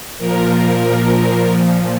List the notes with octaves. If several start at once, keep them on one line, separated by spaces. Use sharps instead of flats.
A#2 F3 A#4
A#4
A#2 F3